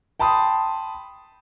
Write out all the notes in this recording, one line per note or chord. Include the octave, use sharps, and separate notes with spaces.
G5 A5 B5 C6 D#6